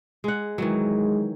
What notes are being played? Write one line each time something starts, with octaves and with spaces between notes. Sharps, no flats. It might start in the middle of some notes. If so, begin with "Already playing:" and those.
G#3 F#5
D#3 E3 F#3 G#3